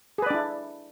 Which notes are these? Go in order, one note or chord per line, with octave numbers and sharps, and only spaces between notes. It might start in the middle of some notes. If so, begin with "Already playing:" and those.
D4 E4 G#4 B4 D5